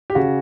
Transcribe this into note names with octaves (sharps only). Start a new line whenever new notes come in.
G4
C#3 F#4